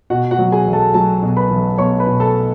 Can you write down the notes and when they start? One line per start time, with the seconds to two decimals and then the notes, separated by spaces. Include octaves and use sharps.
0.10 B2 F#4 F#5
0.31 F#4 F#5
0.39 F#3
0.52 G#4 G#5
0.66 B1
0.73 A4 A5
0.94 F#3 A4 A5
1.22 B2
1.37 B4 B5
1.51 B1
1.78 B1 C#5 C#6
2.00 B4 B5
2.07 B2
2.20 A4 A5